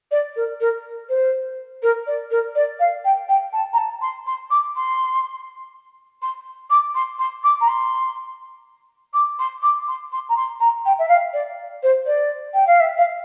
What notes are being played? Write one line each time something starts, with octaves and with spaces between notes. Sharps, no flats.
D5
A#4
A#4
C5
A#4
D5
A#4
D5
F5
G5
G5
A5
A#5
A5
C6
C6
D6
C6
C6
D6
C6
C6
D6
A#5
C6
D6
C6
D6
C6
C6
A#5
C6
A#5
G5
E5
F5
D5
C5
D5
G5
F5
E5
F5